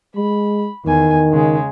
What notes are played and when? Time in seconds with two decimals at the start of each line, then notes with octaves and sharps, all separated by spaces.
0.16 G#3 B5
0.85 E2 D#3 G#5
1.32 C#3 G#3